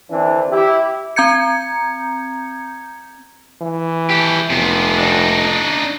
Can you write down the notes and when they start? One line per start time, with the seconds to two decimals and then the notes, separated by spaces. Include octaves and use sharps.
0.10 D3 E3 C4 D4
0.51 E4 G4
1.16 C4 A#5 G6 G#6 C#7
3.61 E3
4.10 G4 A4
4.50 F1 C3 B3
4.98 D4 D#4